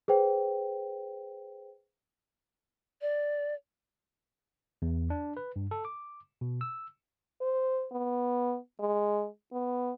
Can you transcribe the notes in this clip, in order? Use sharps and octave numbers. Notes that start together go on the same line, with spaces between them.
G#4 B4 C5 G5
D5
E2
D4
B4
G2
A4
D6
B2
E6
C5
B3
G#3
B3